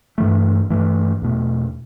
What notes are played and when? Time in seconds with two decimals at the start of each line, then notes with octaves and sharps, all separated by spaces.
0.18 G2 E3 A3
0.70 G2 E3 A3
1.22 E2 B2 A3